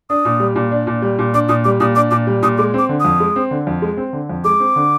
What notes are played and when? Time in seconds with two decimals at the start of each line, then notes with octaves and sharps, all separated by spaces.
0.10 D4 D#6
0.25 A#2
0.40 G3
0.56 A#2
0.71 D4
0.87 A#2
1.02 G3
1.19 A#2
1.34 D4 D6
1.49 A#2 D#6
1.64 G3 D6
1.80 A#2 D#6
1.96 D4 D6
2.11 A#2 D6
2.27 G3
2.43 A#2 D#6
2.57 G#3 D6
2.74 C4 D6
2.89 D3
3.00 F2 D#6
3.20 G#3
3.36 C4
3.51 D3
3.67 F2
3.82 G#3
3.97 C4
4.13 D3
4.29 F2
4.44 G#3 D6
4.60 C4
4.76 D3